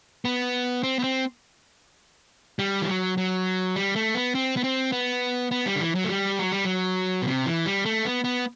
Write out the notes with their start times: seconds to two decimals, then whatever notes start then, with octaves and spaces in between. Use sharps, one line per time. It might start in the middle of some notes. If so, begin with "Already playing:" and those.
0.25 B3
0.83 C4
0.99 B3
1.03 C4
2.59 G3
2.82 E3
2.88 F#3
3.17 F#3
3.76 G3
3.96 A3
4.15 B3
4.35 C4
4.57 B3
4.63 C4
4.92 B3
5.51 B3
5.66 G3
5.76 D3
5.81 E3
5.95 F#3
6.04 A3
6.10 G3
6.39 F#3
6.52 G3
6.65 F#3
7.22 B2
7.27 C3
7.46 E3
7.66 G3
7.85 A3
8.05 B3
8.24 B3